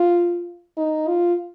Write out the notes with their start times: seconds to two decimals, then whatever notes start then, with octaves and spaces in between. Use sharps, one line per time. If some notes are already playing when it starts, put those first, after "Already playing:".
Already playing: F4
0.77 D#4
1.08 F4